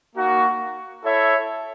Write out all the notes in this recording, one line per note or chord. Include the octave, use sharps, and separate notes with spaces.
A#3 D#4 F#4
E4 A4 C#5 E5